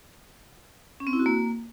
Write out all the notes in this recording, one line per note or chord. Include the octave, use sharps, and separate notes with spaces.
C#4
C4
E4
F#4
A#3